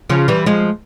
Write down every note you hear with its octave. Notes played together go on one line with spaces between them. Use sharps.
C#3 F3
E3 G3
F3 G#3